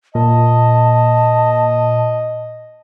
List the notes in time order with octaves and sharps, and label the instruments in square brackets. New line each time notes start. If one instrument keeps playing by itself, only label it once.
[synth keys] A#2 [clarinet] D#5 [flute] A5